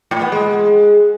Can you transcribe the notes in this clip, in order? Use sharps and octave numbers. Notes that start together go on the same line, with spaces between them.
A2
B3
G#3